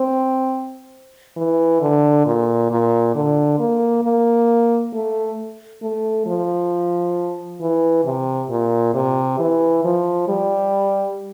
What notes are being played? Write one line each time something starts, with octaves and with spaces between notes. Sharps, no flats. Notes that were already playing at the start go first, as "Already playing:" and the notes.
Already playing: C4
E3
D3
A#2
A#2
D3
A#3
A#3
A3
A3
F3
E3
C3
A#2
C3
E3
F3
G3